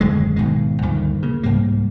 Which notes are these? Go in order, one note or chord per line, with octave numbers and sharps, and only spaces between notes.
D#1 F#2 D3 G#3
G#1 B2 D#3 G#3
D2 G2 A#2 D#3
C#3 A#3
C2 G#2 G3 A#3